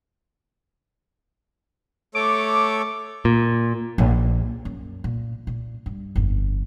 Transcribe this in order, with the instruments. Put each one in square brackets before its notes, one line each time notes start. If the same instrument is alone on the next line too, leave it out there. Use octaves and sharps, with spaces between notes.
[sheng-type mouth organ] A3 A4 C#5 [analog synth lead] D6
[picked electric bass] A#2
[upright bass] A#1
F#2
A#2
A#2
G2
G1 F2